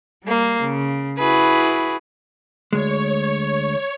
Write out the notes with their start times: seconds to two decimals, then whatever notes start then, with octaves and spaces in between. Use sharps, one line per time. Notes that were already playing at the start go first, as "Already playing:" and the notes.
0.24 G3 A#3
0.59 C#3
1.19 E4 F#4 G#4 B4
2.73 D2 G#3 C#5